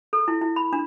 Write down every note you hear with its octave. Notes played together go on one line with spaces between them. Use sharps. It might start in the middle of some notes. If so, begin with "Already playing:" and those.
A4
E4
E4
B5
D4